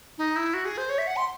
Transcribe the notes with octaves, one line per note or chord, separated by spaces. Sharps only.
D#4
E4
F#4
G#4
C5
C#5
E5
F#5
C6